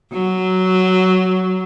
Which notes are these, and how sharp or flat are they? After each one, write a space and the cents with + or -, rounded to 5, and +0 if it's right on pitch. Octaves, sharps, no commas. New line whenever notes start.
F#3 +5